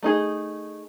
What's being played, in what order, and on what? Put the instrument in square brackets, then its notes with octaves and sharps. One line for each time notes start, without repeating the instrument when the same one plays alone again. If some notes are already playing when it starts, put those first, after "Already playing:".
[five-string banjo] A3 D#4 G#4